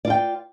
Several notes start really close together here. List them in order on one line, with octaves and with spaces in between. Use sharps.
D5 F4 G5